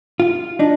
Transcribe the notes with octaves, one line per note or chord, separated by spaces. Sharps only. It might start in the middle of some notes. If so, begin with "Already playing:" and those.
F4
D4 D#4